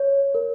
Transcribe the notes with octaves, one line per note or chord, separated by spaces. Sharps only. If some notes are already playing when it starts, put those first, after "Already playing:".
Already playing: C#5
A#4